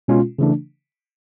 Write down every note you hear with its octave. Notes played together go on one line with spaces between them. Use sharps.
B2 G#3 C#4 F4
C#3 E3 A3 D4